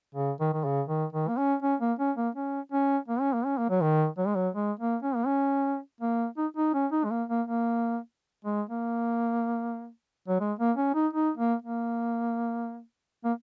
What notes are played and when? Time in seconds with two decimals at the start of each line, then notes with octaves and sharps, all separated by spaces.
0.15 C#3
0.40 D#3
0.53 D#3
0.65 C#3
0.88 D#3
1.13 D#3
1.28 A#3
1.38 C#4
1.62 C#4
1.80 A#3
1.99 C#4
2.17 A#3
2.35 C#4
2.72 C#4
3.08 A#3
3.21 C#4
3.33 A#3
3.45 C#4
3.58 A#3
3.70 F#3
3.82 D#3
4.18 F#3
4.27 G#3
4.35 F#3
4.55 G#3
4.80 A#3
5.03 C#4
5.16 A#3
5.27 C#4
6.01 A#3
6.37 D#4
6.57 D#4
6.74 C#4
6.92 D#4
7.05 G#3
7.11 A#3
7.29 A#3
7.47 A#3
8.45 G#3
8.70 A#3
10.28 F#3
10.40 G#3
10.59 A#3
10.77 C#4
10.95 D#4
11.13 D#4
11.37 A#3
11.62 A#3
13.25 A#3